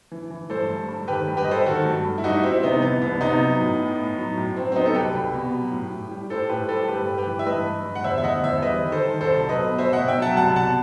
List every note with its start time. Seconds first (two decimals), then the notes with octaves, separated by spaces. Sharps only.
0.11 E3
0.31 E3
0.50 G2 A4 C5
0.70 G2
0.88 G2
1.08 D#3 G4 B4
1.28 G2
1.37 G4 B4
1.44 D#5
1.47 G3 A4 C5
1.66 D#3 F#4 A4
1.85 G2
2.05 G2
2.18 E4
2.24 G3 D#4 F#4
2.43 G3 C4 E4
2.63 C3 B3 D#4
2.82 E3 B3
3.02 C2 B3
3.20 C3 B3 D#4
3.40 F#3
3.60 A2
3.80 A2
3.99 A2
4.18 F#3
4.37 A2
4.56 F#3 C4
4.72 C4
4.76 F#3 B3 D#4
4.86 A4
4.95 C2 G4 B4
5.15 C2
5.34 B2
5.53 F#3
5.72 A2
5.92 A2
6.11 G3
6.30 A2 A4 C5
6.49 A2 G4 B4
6.69 G3 A4 C5
6.88 G2 G4 B4
7.07 G2
7.17 G4 B4
7.27 E3
7.39 E5
7.46 G2 B4 D#5
7.66 G2
7.86 G2
7.95 F#5
8.04 E2 C5 E5
8.18 E5
8.24 E2 D#5 F#5
8.44 E2 C5 E5
8.62 G3 B4 D#5
8.82 D#3
8.92 A4 C5
9.01 D#3
9.21 C2 A4 C5
9.40 F#3
9.49 B4 D#5
9.59 B2
9.79 B2 C5 E5
9.93 D#5 F#5
9.98 B2
10.08 E5 G5
10.18 F#3 F#5 A5
10.37 C2 F#5 A5
10.56 B2 F#5 A5